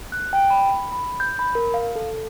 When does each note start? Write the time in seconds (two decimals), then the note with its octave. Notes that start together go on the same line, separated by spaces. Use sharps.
0.12 F#6
0.33 G5
0.50 B5
0.93 B5
1.20 G6
1.39 B5
1.55 A#4
1.74 F5
1.96 A4